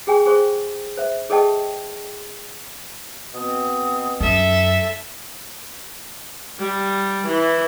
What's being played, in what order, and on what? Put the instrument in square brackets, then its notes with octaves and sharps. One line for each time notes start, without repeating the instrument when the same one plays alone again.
[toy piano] G4 G#4 G5 G#5
G#4 C5 C#6
C5 E5
G#4 A4 D#5 G5 A5
[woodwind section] B2 C4 D#6
[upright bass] F#2 [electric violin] A4 E5
[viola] G3
E3